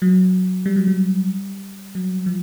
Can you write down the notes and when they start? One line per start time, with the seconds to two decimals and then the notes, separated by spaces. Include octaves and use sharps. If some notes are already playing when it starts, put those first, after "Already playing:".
0.02 F#3
0.66 G3
0.76 F#3
0.87 G3
1.95 F#3
2.26 F3